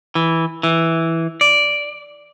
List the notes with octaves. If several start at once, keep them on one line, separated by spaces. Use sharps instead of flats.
E3
E3
D5